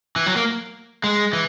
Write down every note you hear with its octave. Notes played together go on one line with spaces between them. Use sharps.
E3
F#3
A#3
G#3
E3